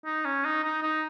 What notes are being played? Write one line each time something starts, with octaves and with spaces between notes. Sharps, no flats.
D#4
C#4
D#4
D#4
D#4